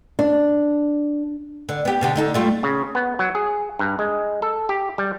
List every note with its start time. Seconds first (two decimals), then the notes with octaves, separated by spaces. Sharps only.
0.19 D4
1.69 D3
1.85 B3 G4
2.01 B2 D3 G4
2.16 D3 D#4 A4
2.34 G3 A3 F4
2.63 C#3
2.95 B3
3.19 F#3
3.35 G#4
3.79 G2
3.99 G#3
4.42 A4
4.69 G4
4.98 G3